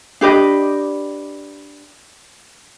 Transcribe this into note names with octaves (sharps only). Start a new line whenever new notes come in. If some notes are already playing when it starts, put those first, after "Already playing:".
D4 G4 B4 D#5